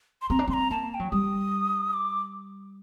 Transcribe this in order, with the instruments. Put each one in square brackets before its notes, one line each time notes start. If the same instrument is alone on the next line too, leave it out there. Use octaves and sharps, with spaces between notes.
[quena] C6
[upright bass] C4 [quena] A#5
[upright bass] D4
[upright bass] C4 [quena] C6
[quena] A#5
[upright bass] A#3 [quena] A5
[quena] A5
G5
[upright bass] F#3
[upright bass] G3 [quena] D#6
[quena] D6